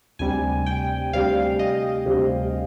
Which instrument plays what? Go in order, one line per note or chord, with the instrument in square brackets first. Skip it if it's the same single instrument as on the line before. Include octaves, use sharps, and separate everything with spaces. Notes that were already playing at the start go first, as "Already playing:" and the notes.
[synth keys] D2 C3 G3 G#5
G5
D2 C3 G3 F5
D#5
D2 C3 G3